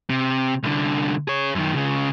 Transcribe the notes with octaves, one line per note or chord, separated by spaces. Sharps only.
C3
C2 D3
G#4 C#5
F#2 D#3
C#2 C#3